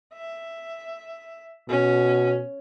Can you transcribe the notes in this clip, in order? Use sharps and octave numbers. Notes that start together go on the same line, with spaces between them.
E5
B2 C#4